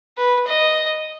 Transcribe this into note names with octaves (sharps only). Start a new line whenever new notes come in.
B4
D#5